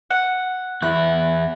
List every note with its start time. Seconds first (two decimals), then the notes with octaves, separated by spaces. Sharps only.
0.11 F#5
0.82 E2 E4 F#6